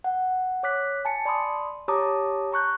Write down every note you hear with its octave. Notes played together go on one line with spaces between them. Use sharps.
F#5
C#5 D6 F#6 B6
G#5 A5 C#7
D5 B5 C6 D6 D#6
G4 C#5 A5 A#5 D6 D#6
A#5 C#6 F#6 G6